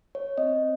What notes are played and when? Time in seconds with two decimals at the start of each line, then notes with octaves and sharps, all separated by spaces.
0.15 C#5
0.38 C4 D#5